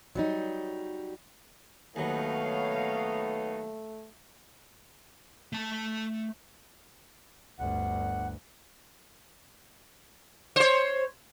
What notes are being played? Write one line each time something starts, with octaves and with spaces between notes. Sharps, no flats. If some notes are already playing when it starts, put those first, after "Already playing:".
F#3 G3 D#4
D#2 F#3 A3 B3 D#4 C#5 F5
A3 A5
G1 D2 F#5
C5 C#5